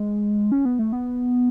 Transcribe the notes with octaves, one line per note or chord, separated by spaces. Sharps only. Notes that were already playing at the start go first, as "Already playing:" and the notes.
Already playing: G#3
C#4
B3
A3
B3